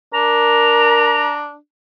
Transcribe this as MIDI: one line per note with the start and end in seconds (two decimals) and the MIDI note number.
0.14 1.56 62
0.14 1.28 70
0.14 1.39 82